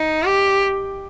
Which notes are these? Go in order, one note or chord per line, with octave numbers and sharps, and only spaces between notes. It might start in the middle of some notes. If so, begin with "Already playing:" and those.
Already playing: D#4
G4